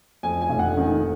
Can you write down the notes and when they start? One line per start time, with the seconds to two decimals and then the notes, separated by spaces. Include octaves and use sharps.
0.23 F2 G#5
0.41 G#5
0.50 F1
0.59 F#5
0.77 D#3